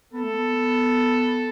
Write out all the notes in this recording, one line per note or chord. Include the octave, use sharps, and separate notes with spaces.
B3 A4
A3
B3